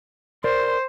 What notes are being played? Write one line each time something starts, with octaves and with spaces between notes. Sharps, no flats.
A#4 C5 D5